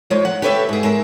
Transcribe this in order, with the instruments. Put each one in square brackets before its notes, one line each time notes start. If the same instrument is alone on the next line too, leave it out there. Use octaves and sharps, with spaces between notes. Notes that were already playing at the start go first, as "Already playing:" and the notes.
[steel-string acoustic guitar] F3 G#3 D#4 C#5
F#5
G4 A4 B4 C#5 D#5 E5
G#2 G#4
G#3 A#4 E5